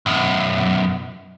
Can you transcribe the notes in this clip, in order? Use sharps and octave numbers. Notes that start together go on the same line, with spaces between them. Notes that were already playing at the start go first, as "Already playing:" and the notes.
B1 F#2